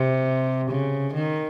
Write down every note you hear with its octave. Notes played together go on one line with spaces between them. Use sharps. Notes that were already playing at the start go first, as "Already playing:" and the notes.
Already playing: C3
C#3
D#3